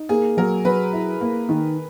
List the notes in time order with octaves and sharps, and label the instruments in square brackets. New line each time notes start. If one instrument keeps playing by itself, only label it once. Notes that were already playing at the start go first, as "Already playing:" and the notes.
Already playing: [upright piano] D#4
[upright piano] A#3 [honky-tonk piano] G#4
[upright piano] F#3 [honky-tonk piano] A#4
[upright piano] F#3 [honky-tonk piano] B4
[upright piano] E4
A#3
D#3